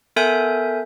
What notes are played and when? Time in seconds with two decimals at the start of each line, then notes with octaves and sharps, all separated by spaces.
0.16 B3 A4 A#4 E5 G#5 G6